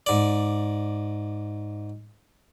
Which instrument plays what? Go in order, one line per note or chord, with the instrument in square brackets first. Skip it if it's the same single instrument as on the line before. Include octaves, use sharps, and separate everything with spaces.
[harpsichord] G#2 D5